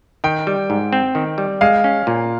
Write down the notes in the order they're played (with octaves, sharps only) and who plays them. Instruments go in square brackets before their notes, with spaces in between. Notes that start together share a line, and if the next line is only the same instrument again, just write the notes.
[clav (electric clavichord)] D#3 [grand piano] G5
[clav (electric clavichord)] G3
G#2
C4
D#3
G3
[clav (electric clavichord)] G#3 [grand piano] F5
[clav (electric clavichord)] C#4
A#2